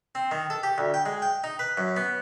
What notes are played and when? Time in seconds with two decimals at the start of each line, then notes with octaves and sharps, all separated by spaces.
0.15 C4
0.31 D#3
0.50 A4
0.63 G4
0.78 D2
0.94 G5
1.06 G#3
1.22 G5
1.44 D#4
1.59 B4
1.77 F#2
1.96 B3